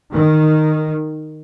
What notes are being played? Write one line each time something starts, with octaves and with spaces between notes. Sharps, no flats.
D#3